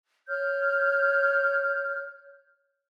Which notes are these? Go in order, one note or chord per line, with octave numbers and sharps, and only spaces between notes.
C#5 F6 G6